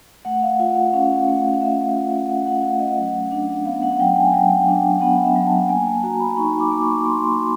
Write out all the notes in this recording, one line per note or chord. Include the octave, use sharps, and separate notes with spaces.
A3 F#5
F5
F4 F5
F#5
C#4 F5
A3
F5
A3 E5
F4
C#4 F#5
F#5
A3 F5
D#5
F#3 F#5
D4
B3 F5
F#5
F#3 G5
G#5
F#3 G5
D4
B3 F#5
E5
F#3
A5
A#3 G#5
A5
F#4 A#5
B5
D#4 C#6
D6
A#3
C#6
A#3 C6
F#4